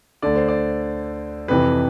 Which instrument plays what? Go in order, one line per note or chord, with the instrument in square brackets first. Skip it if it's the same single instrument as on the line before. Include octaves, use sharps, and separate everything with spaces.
[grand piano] D2 D3 D5
C5
D5
F2 C3 E3 B4